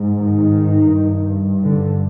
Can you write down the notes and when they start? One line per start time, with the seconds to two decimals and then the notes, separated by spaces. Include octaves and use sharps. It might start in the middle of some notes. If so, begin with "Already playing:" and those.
Already playing: G#2
0.18 D#3
0.90 G2
1.63 D3